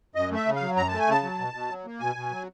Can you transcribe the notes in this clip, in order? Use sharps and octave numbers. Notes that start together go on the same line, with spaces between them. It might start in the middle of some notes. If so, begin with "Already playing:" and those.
F#2 D#5
A3 E5
C#3
F5
F#3
F#2 A#5
A3 A5
G#5
C#3 A5
F#3
B2
B2
F#3
A#3
B2 G#5
B2
F#3